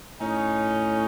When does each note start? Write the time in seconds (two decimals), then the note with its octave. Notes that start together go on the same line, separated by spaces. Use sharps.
0.20 A2 C#4 D#4